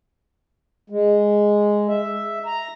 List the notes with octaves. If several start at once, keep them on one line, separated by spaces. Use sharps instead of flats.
G#3
E5
A#5